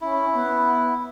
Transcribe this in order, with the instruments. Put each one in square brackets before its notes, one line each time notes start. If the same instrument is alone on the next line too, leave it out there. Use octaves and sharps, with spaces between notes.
[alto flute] C#4 [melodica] E4
[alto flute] B3